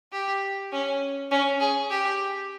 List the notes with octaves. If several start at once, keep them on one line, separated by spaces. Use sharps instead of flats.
G4
C#4
C#4
G#4
G4